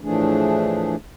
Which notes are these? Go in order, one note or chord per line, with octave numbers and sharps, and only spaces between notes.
A2 E3 F3 A3 D4 G#4